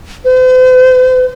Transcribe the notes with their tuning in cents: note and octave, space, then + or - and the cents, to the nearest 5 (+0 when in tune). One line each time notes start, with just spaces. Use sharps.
C5 -45